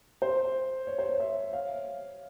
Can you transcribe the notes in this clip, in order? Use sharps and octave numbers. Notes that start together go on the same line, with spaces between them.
C5
C#5
C5
C#5
C5 E5
C#5 F5